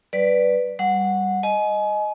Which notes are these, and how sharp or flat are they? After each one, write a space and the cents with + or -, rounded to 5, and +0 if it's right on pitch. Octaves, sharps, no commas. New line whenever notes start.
G3 -35 B4 +0 D5 +0
G3 +0 F#5 -15
D#5 +0 G#5 +30